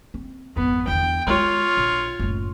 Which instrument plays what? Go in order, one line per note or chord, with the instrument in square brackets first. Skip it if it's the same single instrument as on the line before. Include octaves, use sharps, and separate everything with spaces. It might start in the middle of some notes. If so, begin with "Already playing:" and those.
[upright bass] C4
[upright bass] G#1 F2 [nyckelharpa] B3
[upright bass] E2 D3 [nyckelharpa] G5
[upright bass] G#3 C4 [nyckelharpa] F4 C#5
[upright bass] A#1
F#1 A2